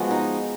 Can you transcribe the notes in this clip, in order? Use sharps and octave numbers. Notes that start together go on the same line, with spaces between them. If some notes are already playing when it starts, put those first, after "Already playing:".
Already playing: F3 G#3 B3 F#4 G#4
D#4